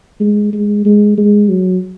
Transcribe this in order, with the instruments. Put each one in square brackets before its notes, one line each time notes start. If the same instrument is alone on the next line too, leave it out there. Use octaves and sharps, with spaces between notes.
[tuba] G#3
G#3
G#3
G#3
F#3